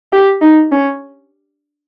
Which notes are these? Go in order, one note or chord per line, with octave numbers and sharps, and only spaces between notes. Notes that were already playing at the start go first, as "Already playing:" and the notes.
G4
D#4
C#4